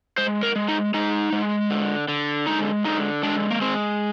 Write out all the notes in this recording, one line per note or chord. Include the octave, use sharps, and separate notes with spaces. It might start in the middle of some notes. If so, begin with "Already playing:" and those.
G#3 C5
A#4
G#3
D#4
G#3 D#4
G#3
D3
D3
G#3 D#4
D3 D#4
G#3 D4
A#3
G#3 C4